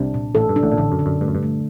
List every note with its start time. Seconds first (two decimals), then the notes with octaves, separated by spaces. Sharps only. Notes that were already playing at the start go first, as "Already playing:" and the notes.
Already playing: C2 C3 D4
0.14 A#2
0.35 A1 A2 A4
0.49 G2
0.56 D4
0.63 A1 A2
0.72 A#2
0.77 A1 A2 D3
0.92 F#2
0.99 D3
1.06 F#2
1.21 G2 A3
1.28 F#2
1.35 G2
1.43 A3